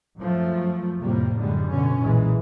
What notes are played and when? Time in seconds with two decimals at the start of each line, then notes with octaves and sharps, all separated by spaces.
0.17 F#2 F3 A3
1.01 F2 A2 C3 G3 A#3
1.37 F#2 D3 G3 G#3
1.68 B2 D3 C#4
2.03 B1 A#2 E3 G#3